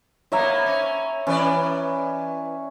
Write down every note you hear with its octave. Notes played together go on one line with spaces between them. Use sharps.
G#2 A#3 B3 C#5 E5 A#5
C#4
E3 C#4 B4 D5